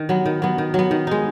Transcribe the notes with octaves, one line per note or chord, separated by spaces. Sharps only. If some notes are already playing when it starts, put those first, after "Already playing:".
Already playing: D#3
F#3 B3
D#3
F#3 B3
D#3
F#3 B3
D#3
G#3 D#4